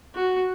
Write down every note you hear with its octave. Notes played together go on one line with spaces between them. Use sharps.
F#4